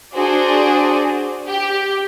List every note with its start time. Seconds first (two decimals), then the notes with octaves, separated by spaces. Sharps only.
0.14 D4 F#4 G#4 C5 D5
1.47 G4